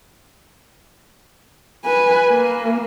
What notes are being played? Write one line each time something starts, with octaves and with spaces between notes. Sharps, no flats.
B4 G#5
A#3